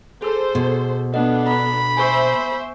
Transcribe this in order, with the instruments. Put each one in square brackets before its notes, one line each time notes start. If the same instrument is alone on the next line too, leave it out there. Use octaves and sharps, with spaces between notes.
[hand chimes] G#4 E6 [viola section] A4 C5
[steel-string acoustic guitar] B2
[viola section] B3 D4 A4 [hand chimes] D#5 F#5
[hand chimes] A#5 [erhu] B5
[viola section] C5 E5 [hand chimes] G#5 C#6